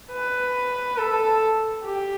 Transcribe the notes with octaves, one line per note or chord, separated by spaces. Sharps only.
B4
A4
G4